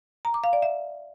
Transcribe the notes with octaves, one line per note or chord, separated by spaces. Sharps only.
A#5
D6
F5
D5
E5